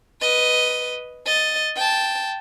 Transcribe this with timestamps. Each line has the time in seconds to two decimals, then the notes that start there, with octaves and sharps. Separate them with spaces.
0.21 B4 D#5
1.26 D#5 A6
1.76 G5 A5